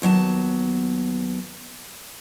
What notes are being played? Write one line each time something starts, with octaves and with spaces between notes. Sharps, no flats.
D#2 F#3 B3 A5